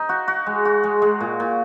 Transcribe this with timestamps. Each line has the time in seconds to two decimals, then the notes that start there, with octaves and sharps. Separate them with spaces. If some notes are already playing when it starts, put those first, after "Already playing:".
Already playing: D#4
0.09 F#4
0.28 F#4
0.46 G#3
0.65 F#4
0.84 G#3
1.02 G#3
1.20 A#2
1.40 A#2